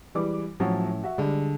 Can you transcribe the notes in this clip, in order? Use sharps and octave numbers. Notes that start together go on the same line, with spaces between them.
E3 G3 G#3 D6
A2 F3 F#3 C#4
F#4 E5
D3 G3 G#3